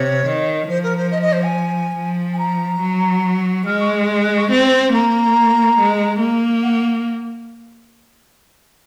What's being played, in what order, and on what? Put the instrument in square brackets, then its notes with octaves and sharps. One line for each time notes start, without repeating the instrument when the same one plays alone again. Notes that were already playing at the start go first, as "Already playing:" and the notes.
Already playing: [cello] C3 [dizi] C#5
[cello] D#3
[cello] F3 [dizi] C5
[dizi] A#4
C5
D#5
D#5
C5
G#5
[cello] F3
[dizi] G#5
A#5
[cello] F#3
[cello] G#3 [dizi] F6
[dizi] C#6
C6
F#6
C#6
[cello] C4
[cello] A#3 [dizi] A#5
[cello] G#3
A#3
[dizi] F#5